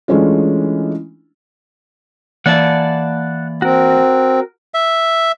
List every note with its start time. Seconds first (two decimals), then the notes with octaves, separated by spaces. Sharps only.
0.08 E3 G#3 A3 C#4 D4 F4
2.46 E3 A#3 D5 F#5 A5
3.62 C4 F#4 A#4
4.74 E5